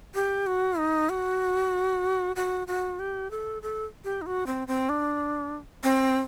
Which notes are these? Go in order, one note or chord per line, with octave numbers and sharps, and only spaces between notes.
G4
F#4
D#4
F#4
F#4
F#4
G4
A4
A4
G4
D#4
F#4
C4
C4
D4
C4